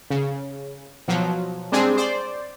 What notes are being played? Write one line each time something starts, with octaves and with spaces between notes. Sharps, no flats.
C#3
B2 F3 F#3
G3 G#3 C4 D4 G#4
C5 D5